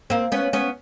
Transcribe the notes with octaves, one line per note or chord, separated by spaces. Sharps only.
A#3 C4
B3 C#4
B3 C#4